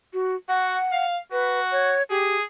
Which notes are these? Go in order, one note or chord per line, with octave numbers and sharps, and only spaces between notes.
F#4
F#4 F#5
F5
F#4 B4
C#5
G4 G#4